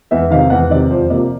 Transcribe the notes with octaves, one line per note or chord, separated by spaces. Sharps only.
E2 E5
C3 D#3 F5
E2 F#5
C3 D#3 D5
F2 C5
C3 F3 A#3 D5